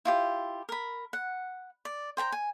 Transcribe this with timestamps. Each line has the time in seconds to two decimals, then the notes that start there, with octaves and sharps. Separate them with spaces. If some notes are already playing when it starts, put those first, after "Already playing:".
0.05 E4 F4 G4
0.69 A#4 B5
1.13 F#5
1.85 D5
2.17 C5 G5 A5 A#5
2.32 G#5